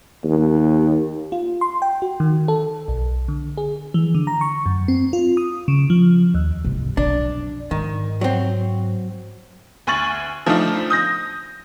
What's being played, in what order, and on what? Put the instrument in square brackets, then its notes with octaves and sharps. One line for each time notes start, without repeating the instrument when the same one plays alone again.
[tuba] D#2
[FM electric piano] F4
C6
G5
F#4
D#3
A4
B1
D3
G#4
E3
D3
A#5
C#6
F#2
C4
F4
D#6
C#3
F3
D#2
[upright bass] C2 G#2
[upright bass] B1 F2 [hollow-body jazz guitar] D4
[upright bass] G#2 [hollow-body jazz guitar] D#3
[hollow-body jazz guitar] F#3 C4
[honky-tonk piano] D2 G#5 C#6 A6 F#7
F3 A3 C4 D4 D#4 F4
D#6 G6 A#6